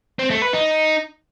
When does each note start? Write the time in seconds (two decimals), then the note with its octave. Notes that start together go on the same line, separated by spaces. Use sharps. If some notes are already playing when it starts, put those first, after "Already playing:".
0.19 C4
0.30 A3
0.42 B4
0.53 D#4